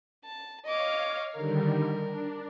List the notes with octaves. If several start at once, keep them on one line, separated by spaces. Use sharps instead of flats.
A5
C#5 D#5 F5 D6
D3 D#3 G3 A#4
D4